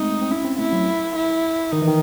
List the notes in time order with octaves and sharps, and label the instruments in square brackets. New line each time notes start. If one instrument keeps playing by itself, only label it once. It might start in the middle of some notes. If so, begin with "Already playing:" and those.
Already playing: [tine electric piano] G#3 A3 C4 [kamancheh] D#4
[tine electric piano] C4
[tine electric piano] C#4 [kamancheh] E4
[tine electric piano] C4
[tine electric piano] A3 [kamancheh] E4
[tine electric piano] F#3
[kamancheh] E4
[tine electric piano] D#3 [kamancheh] D#4
[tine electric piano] E3
D#3